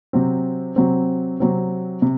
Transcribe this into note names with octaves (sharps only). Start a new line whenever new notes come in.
C3 F#3 C4
C3 F#3 C4
C3 F#3 C4
C3